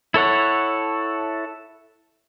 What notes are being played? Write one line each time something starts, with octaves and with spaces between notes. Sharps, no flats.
E4 A4 C#5 F#5